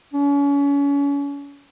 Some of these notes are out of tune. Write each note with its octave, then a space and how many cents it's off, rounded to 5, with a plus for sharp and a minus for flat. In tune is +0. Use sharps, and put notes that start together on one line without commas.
C#4 +35